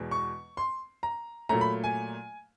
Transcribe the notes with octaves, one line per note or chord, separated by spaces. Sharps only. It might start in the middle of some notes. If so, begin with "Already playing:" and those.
Already playing: E2 B2 G#3
C#6
C6
A#5
A#2 F#3 A3 A#5
B5
G#5